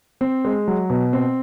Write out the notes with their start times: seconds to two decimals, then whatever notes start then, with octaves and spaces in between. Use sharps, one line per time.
0.21 C4
0.45 G#3
0.68 F#3
0.90 B2
1.13 C4